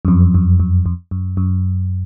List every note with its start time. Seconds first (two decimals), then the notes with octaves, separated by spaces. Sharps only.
0.05 F#2
0.08 F2
0.34 F#2
0.60 F#2
0.86 F2
1.11 F#2
1.37 F#2